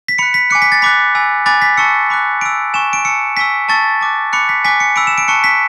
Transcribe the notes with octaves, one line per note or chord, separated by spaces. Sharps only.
B6
B5 F#6 C#7
B6
G#5 D6 F#6 C#7
B6
A6
B5 D6 F#6 B6
G#5 B5 E6
G#5 B5 D6 F#6 A6
B6
A5 C#6 E6 C#7
B5 D6 F#6
B5 E6 D7
G#5 C#6 E6 E7
D7
A5 E6 C#7
G#5 C#6 E6 B6
A5 C#6 E6 A6
A5 D6 F#6
B5 D6 F#6 C#7
B6
G#5 D6 F#6 B6
C#7
B5 E6 D7
E7
D7
A5 C#6 F#6 C#7
B6